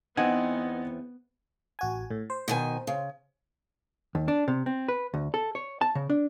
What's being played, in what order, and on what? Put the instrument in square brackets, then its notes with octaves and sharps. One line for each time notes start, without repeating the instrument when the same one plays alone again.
[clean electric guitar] E2 C4 G#5 [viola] B3 [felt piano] D#4 F#5
[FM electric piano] A1 F#4 G#5
A2
C5
[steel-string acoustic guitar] B2 D#3 G#5
C#3
[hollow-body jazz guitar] D#2
D4
C3
C4
B4
D2
A4
C#5
A5
C#3
D4